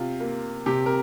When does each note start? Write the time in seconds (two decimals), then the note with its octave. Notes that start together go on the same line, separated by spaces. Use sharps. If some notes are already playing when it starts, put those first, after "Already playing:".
Already playing: C3 F4
0.21 A#3
0.66 C3 G4
0.86 A#4